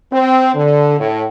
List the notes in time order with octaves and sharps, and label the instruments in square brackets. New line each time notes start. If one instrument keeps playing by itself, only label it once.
[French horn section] C4
D3
A2